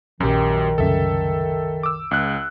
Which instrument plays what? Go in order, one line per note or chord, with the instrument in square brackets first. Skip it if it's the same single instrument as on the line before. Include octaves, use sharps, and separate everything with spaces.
[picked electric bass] A#1 F#3 [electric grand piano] F#2 G4 [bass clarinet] D#3
[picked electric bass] C2 F#2 C#3 [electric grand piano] A4 E5
[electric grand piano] D6 E6
C#2 F#6